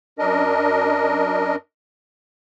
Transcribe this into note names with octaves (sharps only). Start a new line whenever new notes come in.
F#2 D4 A#4 D#5